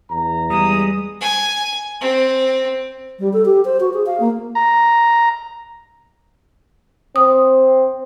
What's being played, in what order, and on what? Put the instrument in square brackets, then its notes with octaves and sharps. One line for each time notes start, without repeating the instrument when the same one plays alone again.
[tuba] E2 [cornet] A#5
[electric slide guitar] G3 G#3 [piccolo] D#6
[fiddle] G#5
C4
[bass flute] G3
A4
G4
C5
F#4
G#4
F5
A#3
[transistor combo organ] A#5
[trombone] C4 [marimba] D#6